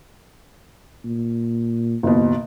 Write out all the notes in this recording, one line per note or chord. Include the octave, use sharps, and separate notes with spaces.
A#2
F#1 D#2 B2